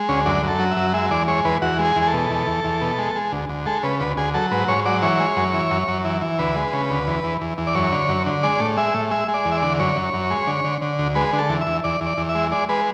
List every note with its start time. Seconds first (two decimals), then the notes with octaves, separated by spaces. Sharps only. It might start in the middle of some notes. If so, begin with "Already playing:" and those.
Already playing: G#3
0.09 D2 C#4
0.26 F#2 D4
0.43 F#2
0.48 A4
0.59 F#3
0.71 E5
0.77 F#2
0.94 G#3 E5
1.11 E2 D5
1.28 G#3 C#5
1.45 E2 B4
1.62 E2 F#4
1.79 G#3
1.85 G#4
1.96 E2
2.02 G#4
2.07 A4
2.13 B2
2.30 E2
2.47 E2
2.64 E2
2.81 B2
2.98 G#3
3.15 G#3
3.32 D2
3.49 D2
3.66 G#3 A4
3.83 C#3 B4
4.00 D2 B4
4.17 D2 G#4
4.34 F#3 A4
4.52 G#2 B4
4.68 G#2 C#5
4.85 F#3 D5
5.02 E3 C#5
5.20 G#3
5.37 F#2
5.54 E3
5.71 F#2
5.88 F#2
6.05 E3
6.22 E3
6.39 D2 B4
6.56 G#3
6.73 C#3
6.90 D2
7.07 E2
7.24 E2
7.41 E2
7.58 E2
7.67 D5
7.75 F#2 C#5
7.92 D3
8.09 F#2
8.26 D3
8.43 G#3 D5
8.60 A2
8.77 G#3 E5
8.94 A2
9.11 G#3 E5
9.28 G#3
9.34 D5
9.45 E2
9.52 E5
9.57 D5
9.62 D3
9.79 F#2 C#5
9.96 F#2
10.14 F#2
10.31 G#3
10.47 D3
10.65 D3
10.82 D3
10.99 D2
11.15 G#3 B4
11.33 D3
11.38 A4
11.50 E2
11.61 E5
11.66 E2
11.84 E2 D5
12.01 E2
12.06 D5
12.18 E2
12.29 E5
12.35 G#3
12.51 G#3 D5
12.69 G#3 B4